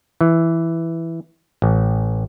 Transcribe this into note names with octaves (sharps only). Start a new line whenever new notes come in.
E3
A1